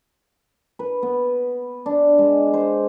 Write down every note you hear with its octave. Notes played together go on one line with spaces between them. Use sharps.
B4
B3
D4
G#3
C5